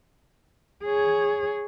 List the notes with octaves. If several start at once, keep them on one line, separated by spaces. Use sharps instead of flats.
G#4 C#5